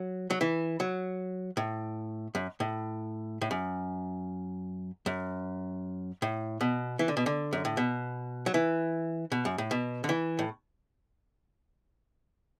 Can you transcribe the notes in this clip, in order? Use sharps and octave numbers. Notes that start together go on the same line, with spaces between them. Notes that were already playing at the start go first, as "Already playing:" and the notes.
Already playing: F#3
F#3
E3
F#3
A2
F#2
A2
A2
F#2
F#2
A2
B2
E3
D3
B2
D3
F#2
A2
B2
F#3
E3
B2
F#2
A2
B2
D3
E3
A2